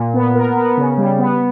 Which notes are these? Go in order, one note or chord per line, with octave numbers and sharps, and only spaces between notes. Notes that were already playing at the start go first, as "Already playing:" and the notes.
Already playing: A#2
B3
A#4
B3
C#3
G3
B3